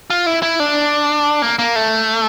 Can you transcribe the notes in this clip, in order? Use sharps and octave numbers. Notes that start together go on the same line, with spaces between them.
F4
E4
E4
D4
A#3
A#3
A3